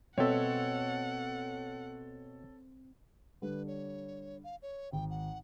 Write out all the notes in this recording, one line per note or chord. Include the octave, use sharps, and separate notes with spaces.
B2 C4 A4 C#5 E5 F#5
D3 G3 B4
C#5
F5
C#5
G#1 G5
F#5